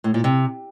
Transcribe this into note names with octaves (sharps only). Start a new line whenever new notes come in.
A2
A#2
C3